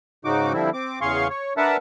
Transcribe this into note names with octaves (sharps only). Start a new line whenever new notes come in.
G#2 C#3 D#4 F#4 D6
D3 F3 G3 C4 E4
C4 D6
E2 C#3 G#4 F5 C6 C#6
C#5
D4 A#4 B4 E5 F#5 A5